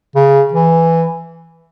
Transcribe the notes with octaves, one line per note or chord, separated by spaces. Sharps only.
C#3
E3